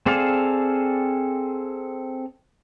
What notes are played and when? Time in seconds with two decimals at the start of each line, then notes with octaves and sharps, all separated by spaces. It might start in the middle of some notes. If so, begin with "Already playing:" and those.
0.06 C4 G#4 A4 D5 F5